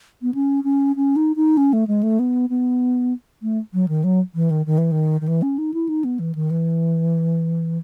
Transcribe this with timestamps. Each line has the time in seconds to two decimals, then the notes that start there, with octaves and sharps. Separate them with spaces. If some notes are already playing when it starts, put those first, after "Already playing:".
0.22 B3
0.34 C#4
0.64 C#4
0.96 C#4
1.16 D#4
1.36 D#4
1.57 C#4
1.73 A3
1.87 G#3
2.03 A3
2.19 B3
2.50 B3
3.42 A3
3.73 F#3
3.88 D#3
4.04 F#3
4.35 E3
4.50 D#3
4.66 D#3
4.78 E3
4.92 D#3
5.21 D#3
5.28 E3
5.42 C#4
5.58 D#4
5.74 E4
5.89 D#4
6.04 B3
6.19 E3
6.35 D#3
6.50 E3